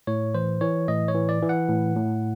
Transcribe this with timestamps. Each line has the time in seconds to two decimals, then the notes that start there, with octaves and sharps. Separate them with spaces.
0.07 A2 C#5
0.35 E3 C5
0.61 E3 C#5
0.88 A2 D#5
1.08 C#5
1.14 E3
1.29 D5
1.42 E3
1.49 F#5
1.69 A2
1.96 A2